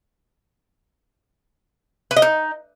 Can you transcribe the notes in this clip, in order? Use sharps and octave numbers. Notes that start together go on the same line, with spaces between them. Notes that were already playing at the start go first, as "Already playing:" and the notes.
B4
D#5
D#4